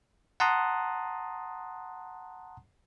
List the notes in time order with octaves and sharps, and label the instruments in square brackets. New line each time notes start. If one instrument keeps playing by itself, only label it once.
[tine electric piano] F#5 A5 A#5 C6 D#6 F#6